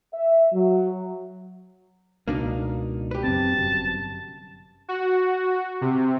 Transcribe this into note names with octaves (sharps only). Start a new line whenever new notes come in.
E5
F#3
C#2 B2 A#3 D4 D#4
G4 B4
F#2 C4 A5
G1 F#2 C3
F#4
C3